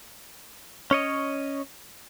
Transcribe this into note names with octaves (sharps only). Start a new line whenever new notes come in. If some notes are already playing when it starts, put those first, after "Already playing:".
C#4 C#5 D#5